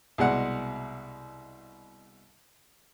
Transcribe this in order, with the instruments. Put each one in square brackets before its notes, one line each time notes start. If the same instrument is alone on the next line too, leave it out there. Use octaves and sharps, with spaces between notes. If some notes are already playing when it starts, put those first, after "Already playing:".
[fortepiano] C2 B2 G#3 D5 F#5